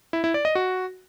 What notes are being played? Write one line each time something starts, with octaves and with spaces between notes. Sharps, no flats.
E4
E4
D5
D#5
F#4